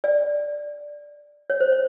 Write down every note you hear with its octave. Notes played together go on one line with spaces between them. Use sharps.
D5
C#5
C5
C#5